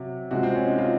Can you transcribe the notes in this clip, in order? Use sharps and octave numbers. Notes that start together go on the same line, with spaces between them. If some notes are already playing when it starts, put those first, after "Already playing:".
Already playing: C3 F#3
C3 F3 G#3 F#4
C4
C#4
D#4
F4